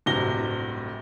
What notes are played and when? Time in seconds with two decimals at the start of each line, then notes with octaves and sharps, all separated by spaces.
0.06 D1 G1 C3 F#4 A#6 G7